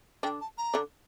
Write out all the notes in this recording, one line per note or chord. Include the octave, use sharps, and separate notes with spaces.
D3 D4 G5
A5
A#5
D3 D4